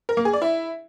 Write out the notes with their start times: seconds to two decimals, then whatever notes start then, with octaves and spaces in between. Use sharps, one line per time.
0.09 A#4
0.17 A#3
0.25 G#4
0.33 D5
0.42 E4